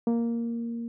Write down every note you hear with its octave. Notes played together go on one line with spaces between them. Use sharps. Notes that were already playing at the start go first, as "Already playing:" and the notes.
A#3